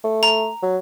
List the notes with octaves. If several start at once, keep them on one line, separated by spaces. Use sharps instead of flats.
A3
A#5
F#3